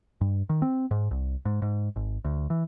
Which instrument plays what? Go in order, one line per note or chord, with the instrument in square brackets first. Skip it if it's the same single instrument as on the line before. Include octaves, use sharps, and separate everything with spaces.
[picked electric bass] G2
D#3
C4
G#2
C2
G#2
G#2
G#1
D2
E3